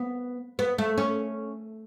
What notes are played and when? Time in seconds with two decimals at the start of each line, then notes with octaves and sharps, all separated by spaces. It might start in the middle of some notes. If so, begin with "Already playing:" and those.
Already playing: B3
0.59 B3
0.78 A3
0.98 C#4